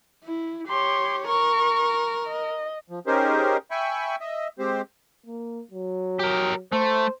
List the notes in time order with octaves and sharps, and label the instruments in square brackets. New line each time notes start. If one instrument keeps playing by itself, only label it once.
[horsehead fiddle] E4
[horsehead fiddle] G4 C#5 [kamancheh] C6
[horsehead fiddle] A#4 [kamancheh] C#6
[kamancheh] D#5
[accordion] F3
C#4 D#4 G4 G#4 A#4 C5
E5 G5 G#5 B5 C#6
D#5 E5
G#3 C4 G4 C5
[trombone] A#3
F#3
[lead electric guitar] G4 A#4
[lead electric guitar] A3 [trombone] C5